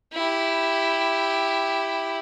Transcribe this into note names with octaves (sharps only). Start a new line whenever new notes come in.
E4 G4